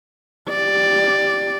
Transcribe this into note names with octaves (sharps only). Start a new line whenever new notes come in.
G4 D5